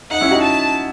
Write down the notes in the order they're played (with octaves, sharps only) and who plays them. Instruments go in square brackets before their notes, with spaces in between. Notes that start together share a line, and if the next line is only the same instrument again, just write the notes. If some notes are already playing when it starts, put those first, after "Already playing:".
[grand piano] D#4 [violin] F#5
[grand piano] C#4 E4
D#4 F#4
[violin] A5